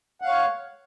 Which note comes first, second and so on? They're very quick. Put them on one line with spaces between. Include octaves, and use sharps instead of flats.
F#5 F5 C#5